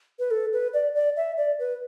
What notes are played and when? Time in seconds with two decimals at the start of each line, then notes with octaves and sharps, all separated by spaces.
0.19 B4
0.31 A4
0.53 B4
0.74 D5
0.95 D5
1.17 E5
1.37 D5
1.59 B4